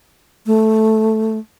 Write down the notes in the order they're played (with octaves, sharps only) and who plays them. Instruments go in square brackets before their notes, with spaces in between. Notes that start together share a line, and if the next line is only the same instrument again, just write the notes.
[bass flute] A3